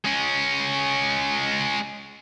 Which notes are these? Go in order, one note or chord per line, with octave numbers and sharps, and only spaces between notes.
G#3 C#4